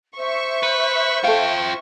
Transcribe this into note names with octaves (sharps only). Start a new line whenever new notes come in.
C5 E5 C#6
B4
F4 A4 F5 G5